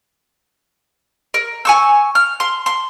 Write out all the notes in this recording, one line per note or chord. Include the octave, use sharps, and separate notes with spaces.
A#4
G#5 C#6 E6
F6
C6
C6